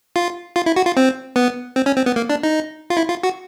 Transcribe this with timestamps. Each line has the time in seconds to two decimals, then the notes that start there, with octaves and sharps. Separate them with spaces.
0.16 F4
0.56 F4
0.66 E4
0.76 F#4
0.86 F4
0.97 C4
1.36 B3
1.76 C4
1.86 C#4
1.97 C4
2.06 B3
2.16 A#3
2.30 D4
2.43 D#4
2.90 F4
2.97 E4
3.09 F4
3.23 F#4